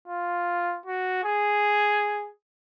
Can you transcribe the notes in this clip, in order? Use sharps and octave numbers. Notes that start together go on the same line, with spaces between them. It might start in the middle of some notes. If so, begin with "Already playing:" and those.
F4
F#4
G#4